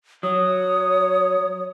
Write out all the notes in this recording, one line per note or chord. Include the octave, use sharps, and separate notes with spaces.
F#3 C#5 D#6